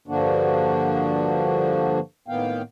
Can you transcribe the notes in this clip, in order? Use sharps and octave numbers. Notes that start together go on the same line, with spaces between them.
G2 D3 F3 A#3 D4 F#4
A2 D#3 A#3 B3 F5 G5